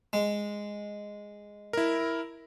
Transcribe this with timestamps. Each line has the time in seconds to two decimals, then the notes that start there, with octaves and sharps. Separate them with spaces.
0.13 G#3
1.73 E4 A#4